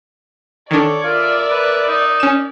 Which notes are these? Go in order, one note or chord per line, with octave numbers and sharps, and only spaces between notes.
D#3 D4 A4 C#5 D5
F4 A#4 E5
B4
D#4
C#4 E7